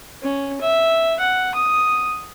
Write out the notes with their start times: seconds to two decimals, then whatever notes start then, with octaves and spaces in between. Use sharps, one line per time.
0.23 C#4
0.61 E5
1.19 F#5
1.54 D#6